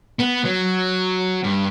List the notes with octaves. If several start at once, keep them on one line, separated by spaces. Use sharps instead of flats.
B3
F#3
G2